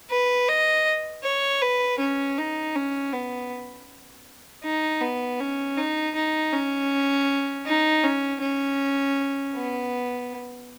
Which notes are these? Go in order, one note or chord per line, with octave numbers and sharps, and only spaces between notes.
B4
D#5
C#5
B4
C#4
D#4
C#4
B3
D#4
B3
C#4
D#4
D#4
C#4
D#4
C#4
C#4
B3